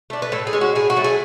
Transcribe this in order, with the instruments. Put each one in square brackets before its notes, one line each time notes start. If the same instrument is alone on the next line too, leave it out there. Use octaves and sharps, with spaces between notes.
[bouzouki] A3 D4
B4
A2 A4
G#4
G#3 C#4
F#4
A2 G#4
F#4
F#3 A3
G#4